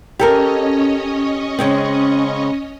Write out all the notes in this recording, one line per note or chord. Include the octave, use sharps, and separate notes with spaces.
C#4 G4 A4 A#4 C#5 D#5
C#3 G#3 C4